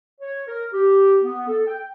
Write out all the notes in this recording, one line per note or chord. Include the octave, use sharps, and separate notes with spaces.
C#5
A#4
G4
B3
A4
G5